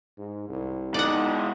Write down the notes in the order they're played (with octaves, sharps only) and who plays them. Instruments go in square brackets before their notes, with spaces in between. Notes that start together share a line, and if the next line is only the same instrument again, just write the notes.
[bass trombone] G#2
C2
[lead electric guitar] B2 G#3 [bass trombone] D#4 [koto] D5 F#5